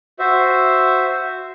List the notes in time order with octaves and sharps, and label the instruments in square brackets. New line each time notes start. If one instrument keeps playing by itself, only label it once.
[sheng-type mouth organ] F#4 C5 E5